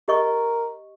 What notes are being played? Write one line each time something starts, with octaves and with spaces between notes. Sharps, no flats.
G4 A#4 D#5 C#6